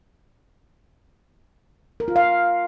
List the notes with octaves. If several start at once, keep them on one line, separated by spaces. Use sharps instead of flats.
A#4
F4
F5